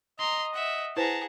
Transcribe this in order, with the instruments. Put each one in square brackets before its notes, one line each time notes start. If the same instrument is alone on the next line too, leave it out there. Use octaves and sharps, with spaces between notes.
[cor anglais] D#5 [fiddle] A#5 [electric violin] C6
[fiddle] E5 [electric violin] F#5
[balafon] E4 B4 C5 [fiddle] G#4 F#5 [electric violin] A5 A#5